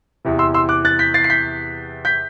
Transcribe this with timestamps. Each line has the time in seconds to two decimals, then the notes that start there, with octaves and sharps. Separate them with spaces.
0.25 E2 C3 E3
0.39 C6 E6
0.54 C6 E6
0.69 D6 F#6
0.85 F#6 A6
0.99 G6 B6
1.14 A6 C7
1.24 C7
1.30 G6 B6
2.05 G6 B6